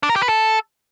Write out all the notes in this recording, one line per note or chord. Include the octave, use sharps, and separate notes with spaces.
D4
A#4
G4
B4
A4